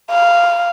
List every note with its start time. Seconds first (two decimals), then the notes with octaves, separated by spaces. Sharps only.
0.11 F5